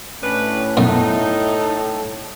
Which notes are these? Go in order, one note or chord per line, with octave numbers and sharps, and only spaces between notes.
A2 C#4 D4 B4
F#2 B2 D#4 A4